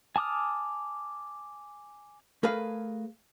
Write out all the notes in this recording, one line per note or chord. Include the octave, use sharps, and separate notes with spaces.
G#5 A5 D6 D#6 F6
A3 G#4 A#4 B4 F5